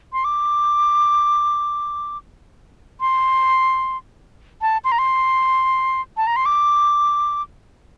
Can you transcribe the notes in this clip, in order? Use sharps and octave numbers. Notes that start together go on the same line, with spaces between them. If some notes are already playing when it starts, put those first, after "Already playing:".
C6
D6
C6
A5
C6
A#5
C6
A5
A#5
C6
D6